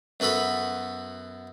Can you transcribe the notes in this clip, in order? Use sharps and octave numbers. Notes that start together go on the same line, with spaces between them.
F#2 B3 F#4 A4 B5